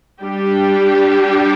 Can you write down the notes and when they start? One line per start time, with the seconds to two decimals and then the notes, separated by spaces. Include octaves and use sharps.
0.21 G3 D4 G4